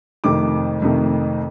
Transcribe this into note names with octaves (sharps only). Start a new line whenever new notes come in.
F2 C3 D#3 A3 D6
F2 C3 D#3 A3